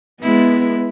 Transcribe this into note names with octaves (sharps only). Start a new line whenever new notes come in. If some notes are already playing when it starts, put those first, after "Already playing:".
G#3 B3 E4